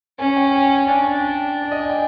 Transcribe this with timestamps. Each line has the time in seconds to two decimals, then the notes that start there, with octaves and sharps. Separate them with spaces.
0.19 C#4 G#5
0.36 G5
0.55 G#5
0.73 G#5
0.90 D4 G5
1.02 G#5
1.15 G5
1.62 D5
1.71 D#5
1.80 G#5
1.89 G5